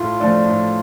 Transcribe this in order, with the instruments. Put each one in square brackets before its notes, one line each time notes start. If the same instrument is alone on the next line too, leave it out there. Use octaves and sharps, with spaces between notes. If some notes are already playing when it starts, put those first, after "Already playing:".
Already playing: [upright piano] A2 [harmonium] F4
[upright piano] F3 A3 D4
A2